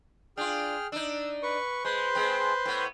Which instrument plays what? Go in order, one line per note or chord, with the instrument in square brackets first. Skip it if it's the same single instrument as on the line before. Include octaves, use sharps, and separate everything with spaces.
[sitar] D4 F4 [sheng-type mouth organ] G#4 G5 F6
[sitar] D4 D#4 [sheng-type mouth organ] E6
[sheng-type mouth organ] B4 C#6
[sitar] G#3 [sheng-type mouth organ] B4 C5 C6
[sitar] G#3 C4
A2 B3